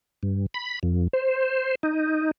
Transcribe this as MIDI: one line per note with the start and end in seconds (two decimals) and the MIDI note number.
0.23 0.46 43
0.54 0.79 83
0.83 1.08 41
1.13 1.75 72
1.83 2.31 63